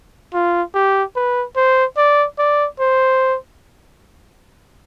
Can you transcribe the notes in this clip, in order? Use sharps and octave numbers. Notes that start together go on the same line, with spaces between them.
F4
G4
B4
C5
D5
D5
C5